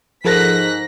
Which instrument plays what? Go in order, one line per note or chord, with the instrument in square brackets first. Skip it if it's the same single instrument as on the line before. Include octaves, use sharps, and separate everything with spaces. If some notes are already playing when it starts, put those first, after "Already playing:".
[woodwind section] G#2 [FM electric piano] F3 A4 A#4 [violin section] F#6 A#6 B6